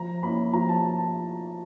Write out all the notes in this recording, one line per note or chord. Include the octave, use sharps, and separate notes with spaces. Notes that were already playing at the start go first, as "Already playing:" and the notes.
Already playing: F3 A#5
A#3 C#4 E4 B5
F3 A#5
A5